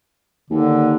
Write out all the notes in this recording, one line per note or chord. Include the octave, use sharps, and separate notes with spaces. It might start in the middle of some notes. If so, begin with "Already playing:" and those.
D#2 D3